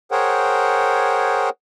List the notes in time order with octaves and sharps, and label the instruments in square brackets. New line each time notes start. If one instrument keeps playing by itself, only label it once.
[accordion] G#4 A#4 C5 C#5 F#5 G5